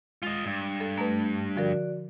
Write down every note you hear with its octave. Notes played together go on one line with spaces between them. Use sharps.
G#3 F4 D#5
G2
A4
A3 B4 A#5
D3 F3 F#4 A#4 D5